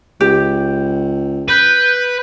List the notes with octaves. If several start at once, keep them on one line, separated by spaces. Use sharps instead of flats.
C#2 G4
B4 G6